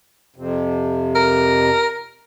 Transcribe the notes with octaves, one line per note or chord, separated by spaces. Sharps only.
F2 C3
A#4